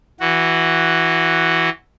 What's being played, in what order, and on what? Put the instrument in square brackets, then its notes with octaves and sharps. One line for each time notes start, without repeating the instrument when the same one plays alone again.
[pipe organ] E3 F#4